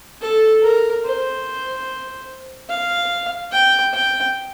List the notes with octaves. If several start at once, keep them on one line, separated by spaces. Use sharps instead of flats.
A4
A#4
C5
F5
G5
G5